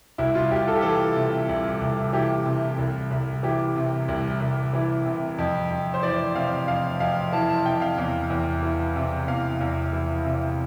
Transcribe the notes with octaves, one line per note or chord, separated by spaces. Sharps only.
C2 E4
F4
C2 G4
A4
G4
E3 A4
C3
C2
C2
E3 G4
C3
C2
C2
E3 G4
C3
C2
C2
E3
C3
F2
F2
C5
E3 D5
C3 F5
F2 F5
F2 F5
E3 A5
A5
C3 G5
F5
E2
E2
E3
C3
E2 F5
E2
E3
C3